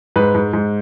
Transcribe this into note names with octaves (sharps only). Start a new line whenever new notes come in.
G#2 B4
G#2
G#2